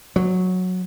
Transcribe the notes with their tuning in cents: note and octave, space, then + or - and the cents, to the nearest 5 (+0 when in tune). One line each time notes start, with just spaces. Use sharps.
F#3 -10